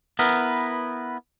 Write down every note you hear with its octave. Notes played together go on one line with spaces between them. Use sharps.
B3 E4 A#4 B4